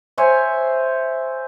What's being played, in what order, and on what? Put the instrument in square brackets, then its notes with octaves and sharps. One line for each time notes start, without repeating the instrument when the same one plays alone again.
[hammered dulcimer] C5 C#5 E5 G#5